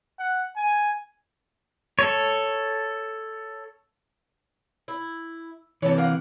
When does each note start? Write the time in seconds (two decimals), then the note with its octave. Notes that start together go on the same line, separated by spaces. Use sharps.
0.19 F#5
0.57 G#5
1.99 A4 C#5
4.88 E4
5.82 C3 E3 A4 C#5
5.98 A#4 F5 F#5